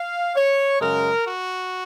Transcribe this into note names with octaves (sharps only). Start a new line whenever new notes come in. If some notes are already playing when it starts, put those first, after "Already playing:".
Already playing: F5
C#5
F#2 C#3 G#3 A#4
F#4